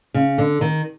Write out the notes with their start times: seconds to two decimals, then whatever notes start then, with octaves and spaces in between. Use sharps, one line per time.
0.14 C#3
0.38 D3
0.61 D#3